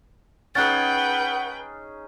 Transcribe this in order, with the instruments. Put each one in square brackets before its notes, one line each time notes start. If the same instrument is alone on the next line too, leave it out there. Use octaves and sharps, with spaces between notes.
[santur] C#4 D#4 G#4 [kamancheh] B4 G5 [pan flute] F#5 [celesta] F#6 A6